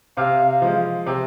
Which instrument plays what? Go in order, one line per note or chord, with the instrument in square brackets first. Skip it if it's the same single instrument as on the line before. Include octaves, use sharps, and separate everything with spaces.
[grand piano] C3 [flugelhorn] F5
[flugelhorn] F5
[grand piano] F3 G#3
C3